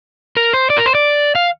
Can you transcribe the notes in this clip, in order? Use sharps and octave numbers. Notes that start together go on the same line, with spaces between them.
A#4
C5
D5
A#4
C5
D5
F5